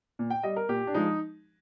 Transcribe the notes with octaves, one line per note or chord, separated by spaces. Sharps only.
A#2
G5
G3 D#5
A#4
A#2 G4
D4
F3 G#3 D#4